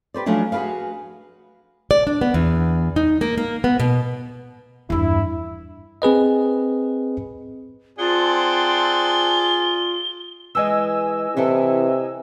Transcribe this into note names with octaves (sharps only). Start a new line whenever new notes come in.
G4 B4 C5 D5
F3 F#3 A3 C#4 D4
F#4 G#4 A#4 B4 F5
D5
D4
B3
E2
D#4
A#3
A#3
B3
B2
E2 G2 E4
C4 G#4 B4 D#5
C4 F4 G#4 D5 F#5 A5 G7
E3 G#3 D#5 G#5 E6
C3 E3 E4 A4